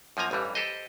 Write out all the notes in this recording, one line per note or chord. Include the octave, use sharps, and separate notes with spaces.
F#2 F3 A#3 G#5 A#5
A1 G2 E3 G3
G4 A4 C5 D#5